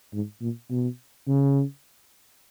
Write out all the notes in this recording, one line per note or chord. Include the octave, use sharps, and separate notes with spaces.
G#2
A#2
B2
C#3